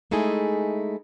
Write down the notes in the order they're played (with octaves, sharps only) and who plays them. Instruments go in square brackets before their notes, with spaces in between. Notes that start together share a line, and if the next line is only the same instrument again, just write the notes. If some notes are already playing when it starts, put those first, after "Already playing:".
[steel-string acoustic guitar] G#3 A3 D#4 E4 G#4